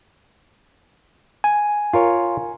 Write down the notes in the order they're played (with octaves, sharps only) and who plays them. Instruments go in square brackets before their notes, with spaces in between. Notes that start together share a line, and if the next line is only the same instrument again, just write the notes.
[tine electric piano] G#5
[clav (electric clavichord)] F4 A#4 C#5